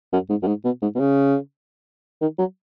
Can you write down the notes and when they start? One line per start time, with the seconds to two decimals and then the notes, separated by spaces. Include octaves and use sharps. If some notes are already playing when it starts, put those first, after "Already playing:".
0.13 F#2
0.30 G#2
0.42 F#2
0.47 G#2
0.65 B2
0.82 G#2
0.95 B2
1.00 C#3
2.21 D#3
2.39 F#3